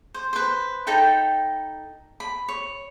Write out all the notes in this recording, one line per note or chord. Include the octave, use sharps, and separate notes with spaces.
C5
B4 C5
D#4 A4 G5 B5
B5
C#5